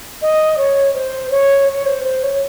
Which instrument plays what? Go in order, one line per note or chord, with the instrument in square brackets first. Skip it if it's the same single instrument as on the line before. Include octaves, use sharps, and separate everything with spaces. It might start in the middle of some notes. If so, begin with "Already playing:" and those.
[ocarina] D#5
C#5
C5
C#5
C#5
C5
C5
C#5